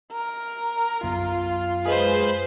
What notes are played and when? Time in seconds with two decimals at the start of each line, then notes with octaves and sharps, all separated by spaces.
0.13 A#4
1.03 F#2 B3 F4
1.85 G#3 G#4 B4 C5